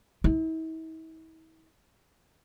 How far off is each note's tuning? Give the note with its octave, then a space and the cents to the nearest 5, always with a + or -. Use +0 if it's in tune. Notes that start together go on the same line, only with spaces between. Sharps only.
E4 -45